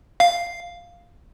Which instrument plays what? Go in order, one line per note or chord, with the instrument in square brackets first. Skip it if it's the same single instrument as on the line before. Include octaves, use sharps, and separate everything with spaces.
[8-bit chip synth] F5